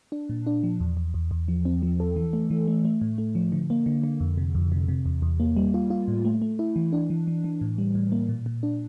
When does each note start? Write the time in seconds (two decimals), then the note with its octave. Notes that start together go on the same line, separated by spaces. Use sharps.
0.12 D4
0.30 A#2
0.47 D4
0.63 F3
0.80 E2
0.97 E2
1.14 E2
1.31 E2
1.48 F3
1.65 C4
1.83 F3
2.00 A4
2.16 E3
2.33 A3
2.50 E3
2.68 A3
2.85 A3
3.01 A2
3.18 A3
3.35 F3
3.52 D3
3.70 A#3
3.86 D3
4.03 D3
4.20 F2
4.37 C3
4.55 F2
4.72 C3
4.88 C3
5.06 E2
5.22 E2
5.40 A#3
5.56 G3
5.74 F4
5.90 F4
6.08 A2
6.25 A3
6.42 A3
6.59 E4
6.76 E3
6.93 D4
7.10 E3
7.27 E3
7.44 E3
7.61 A2
7.78 G3
7.95 A2
8.12 A#3
8.29 A#2
8.46 A#2
8.63 D4